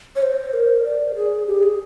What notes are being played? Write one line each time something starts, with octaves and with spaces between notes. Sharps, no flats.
C#5
C5
A#4
D5
G#4
G4
G#4